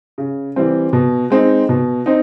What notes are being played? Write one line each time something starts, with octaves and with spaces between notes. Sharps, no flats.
C#3
E3 G3 C4
B2
G#3 C4 D#4
B2
C4 D#4